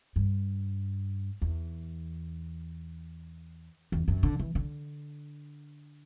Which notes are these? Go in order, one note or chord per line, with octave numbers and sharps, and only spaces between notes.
G2
E2
E2
F#2
D3
E3
D3